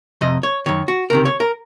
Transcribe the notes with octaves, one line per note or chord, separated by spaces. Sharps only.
F2 C3 D#5
C#5
F#2 D#3 C#5
F#4
C#2 C3 D#3 A#4
C#5
A#4